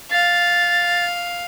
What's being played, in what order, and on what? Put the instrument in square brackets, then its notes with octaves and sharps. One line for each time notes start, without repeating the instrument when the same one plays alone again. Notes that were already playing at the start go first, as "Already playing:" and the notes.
[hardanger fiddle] F5 [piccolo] A6